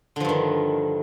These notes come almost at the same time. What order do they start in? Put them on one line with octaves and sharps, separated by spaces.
D3 F3 G2 D#3